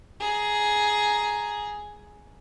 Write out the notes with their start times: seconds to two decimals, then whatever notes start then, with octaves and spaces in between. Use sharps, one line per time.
0.20 G#4 A#5